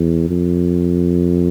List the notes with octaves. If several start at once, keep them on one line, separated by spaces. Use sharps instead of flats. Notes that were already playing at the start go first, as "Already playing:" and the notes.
Already playing: E2
F2